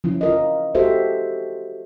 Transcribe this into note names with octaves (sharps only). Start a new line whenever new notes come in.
F3 C#4 E4
F4 A#4 D#5
F#4 G4 A4 C5 E5